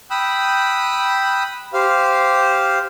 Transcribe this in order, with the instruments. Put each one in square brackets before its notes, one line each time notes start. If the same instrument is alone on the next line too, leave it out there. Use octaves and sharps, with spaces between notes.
[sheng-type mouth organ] G5 B5 D#6 E6 F#6
G4 C5 F5